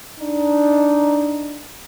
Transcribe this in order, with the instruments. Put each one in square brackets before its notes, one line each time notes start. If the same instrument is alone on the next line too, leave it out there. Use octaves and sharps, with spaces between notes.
[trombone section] D4 D#4